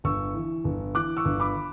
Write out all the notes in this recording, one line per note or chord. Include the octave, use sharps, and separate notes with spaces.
G1 C#6 E6
E3
G1
E3 D6 F#6
C#6 E6
G1
B5 D6